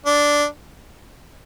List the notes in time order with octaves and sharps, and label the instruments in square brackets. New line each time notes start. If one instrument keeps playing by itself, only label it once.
[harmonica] D4